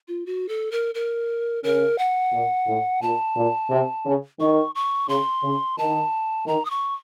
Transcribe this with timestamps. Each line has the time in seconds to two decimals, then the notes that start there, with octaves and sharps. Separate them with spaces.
0.08 F4
0.26 F#4
0.49 A4
0.72 A#4
0.95 A#4
1.64 C#3 A#4
1.98 F#5
2.33 A#2
2.67 A2
3.02 A#2 A5
3.37 A#2
3.71 C3
4.06 C#3
4.40 D#3 C#6
4.75 C#6
5.09 C#3 C6
5.44 C#3
5.78 D#3 A5
6.47 D#3 A#5
6.65 D#6
6.70 C#6